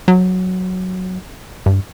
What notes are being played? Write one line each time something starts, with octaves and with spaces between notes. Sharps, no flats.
F#3
G2